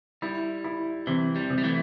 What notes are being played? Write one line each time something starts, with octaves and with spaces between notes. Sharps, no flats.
G3 E4
E4
C3 E3
G3
C3
G3
E3 A3